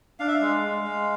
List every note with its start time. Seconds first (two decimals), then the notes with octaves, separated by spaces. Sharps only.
0.19 D4 F5
0.28 E5
0.35 F5
0.41 G#3
0.63 G#3
0.84 G#3